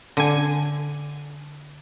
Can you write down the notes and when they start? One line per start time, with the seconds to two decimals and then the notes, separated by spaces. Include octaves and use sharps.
0.17 D3 G#5